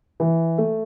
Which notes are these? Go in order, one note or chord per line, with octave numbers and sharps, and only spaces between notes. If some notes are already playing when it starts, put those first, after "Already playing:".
E3
A3